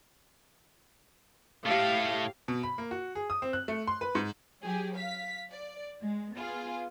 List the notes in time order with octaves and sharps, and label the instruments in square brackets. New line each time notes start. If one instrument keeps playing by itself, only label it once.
[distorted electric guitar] A2 A3 [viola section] G4 F5
[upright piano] B2
B5
A#3
F#4
G#4
D#6
C4
F#6
A3
C6
B4
G#2
[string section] F#3 G4 G#4
F5 B6
D5
G#3
B3 F4 G#4